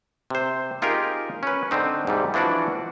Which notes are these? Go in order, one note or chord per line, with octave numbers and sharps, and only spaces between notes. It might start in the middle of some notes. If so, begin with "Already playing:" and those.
C3 C5
D#4 F4 G4 G#4 A#4
C#4 B4
D3 C4 D#4
G#2 C3 G3
E3 F3 D4 F#4 D5